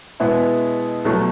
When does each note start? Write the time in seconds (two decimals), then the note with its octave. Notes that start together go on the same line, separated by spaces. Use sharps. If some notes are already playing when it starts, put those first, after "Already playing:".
0.20 B2 G#3 B3 E4 G#4
1.05 C2 B2 F#3 A3